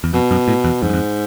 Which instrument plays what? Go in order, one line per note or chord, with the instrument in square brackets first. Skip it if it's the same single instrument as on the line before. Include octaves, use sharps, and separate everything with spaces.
[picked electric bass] E2
[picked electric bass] F2 [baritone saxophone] B2
[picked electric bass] F#2
A2
E2
[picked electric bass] F2 [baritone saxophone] G#2
[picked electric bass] F#2
F2